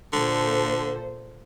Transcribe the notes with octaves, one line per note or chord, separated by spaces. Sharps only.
A#2 D3 A4 C5